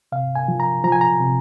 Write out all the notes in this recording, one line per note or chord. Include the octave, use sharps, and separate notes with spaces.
C3 F5
G#5
F3
A#5
F3 A#5
G#5
A#5
C3